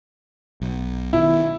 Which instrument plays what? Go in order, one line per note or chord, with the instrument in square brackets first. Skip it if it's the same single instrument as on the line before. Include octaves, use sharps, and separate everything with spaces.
[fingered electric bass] B1
[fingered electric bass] B2 D#3 [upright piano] E4